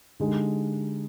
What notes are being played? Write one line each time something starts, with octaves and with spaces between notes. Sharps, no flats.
D3 G#3 D#4 G4